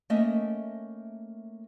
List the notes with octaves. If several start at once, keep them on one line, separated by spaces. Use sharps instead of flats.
A3 A#3 C#4 D#5 E5